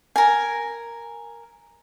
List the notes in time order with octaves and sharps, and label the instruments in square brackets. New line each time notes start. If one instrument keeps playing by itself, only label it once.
[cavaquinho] A#4 G#5